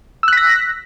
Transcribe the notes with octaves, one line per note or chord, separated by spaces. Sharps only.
E6 F#6 A#6 B6